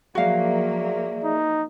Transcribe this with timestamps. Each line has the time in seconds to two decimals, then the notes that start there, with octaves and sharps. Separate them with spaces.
0.15 F3 F#3 A#3 F#4 G#4 D5 E5 F5
1.24 D#4